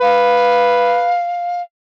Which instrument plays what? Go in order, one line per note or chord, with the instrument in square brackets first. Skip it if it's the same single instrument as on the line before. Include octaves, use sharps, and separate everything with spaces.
[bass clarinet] B4 [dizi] F5